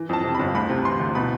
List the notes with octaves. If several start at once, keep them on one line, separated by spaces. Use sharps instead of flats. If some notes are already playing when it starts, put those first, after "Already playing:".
Already playing: E3
F2 A5
C3
G1 B5
D2 B5
C3
E3 C6
D2
B2 B5